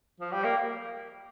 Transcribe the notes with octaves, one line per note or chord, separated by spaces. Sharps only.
F3
G3
A#3